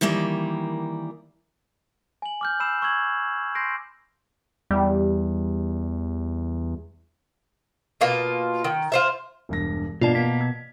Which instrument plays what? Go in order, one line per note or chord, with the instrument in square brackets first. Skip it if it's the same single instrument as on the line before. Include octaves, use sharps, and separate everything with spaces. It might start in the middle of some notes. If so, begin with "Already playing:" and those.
[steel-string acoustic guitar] D#3 E3 G3 A#3
[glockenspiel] G#5 F#7
D6 F6 G6
G#5 B5 E6 C7 E7
C#6 E6 G6 G#6 F#7
C6 G6 G#6 A#6 C7 D7
[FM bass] E2 [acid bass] G3
[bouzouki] B2 A#3 F4
D#3
F4 C5 E5
[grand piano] E1 G2 A#6
[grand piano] G2 A#3 [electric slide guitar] B2 A5 [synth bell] F4 D5
[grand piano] A#3 [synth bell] B6
[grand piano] G#6